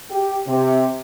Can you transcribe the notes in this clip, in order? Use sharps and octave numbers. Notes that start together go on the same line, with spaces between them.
G4
C3